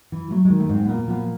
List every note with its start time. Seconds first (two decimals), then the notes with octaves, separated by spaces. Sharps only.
0.12 E3
0.31 F#3 A3
0.45 G#3
0.50 D#3
0.60 A3
0.69 G#2 C4
0.85 A#2 B3
0.97 A#3
1.08 F3 B3